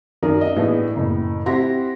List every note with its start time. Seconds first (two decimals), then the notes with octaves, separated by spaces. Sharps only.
0.23 F#2 D#3 F#4 A#4 D5 D#6
0.41 D#5 E5
0.56 A2 E3 B3 D4 G#4
0.96 F#1 A2
1.46 C4 E4 G4 F#5 C6 A#6